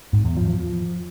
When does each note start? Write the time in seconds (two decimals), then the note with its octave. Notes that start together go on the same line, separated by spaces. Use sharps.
0.13 G#2
0.25 E2
0.37 F3
0.48 F3